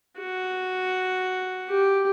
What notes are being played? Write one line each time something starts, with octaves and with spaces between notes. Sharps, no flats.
F#4
G4